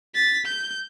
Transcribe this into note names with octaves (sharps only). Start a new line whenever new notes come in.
A6 B6
G6